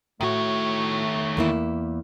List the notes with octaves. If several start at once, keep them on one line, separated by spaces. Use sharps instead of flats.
A2 D#3 A3 F#4 C#5
E2 A#3 E4